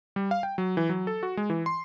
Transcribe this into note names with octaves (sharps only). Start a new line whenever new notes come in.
G3
F5
G5
F#3
E3
F#3
A4
F#4
G#3
E3
C6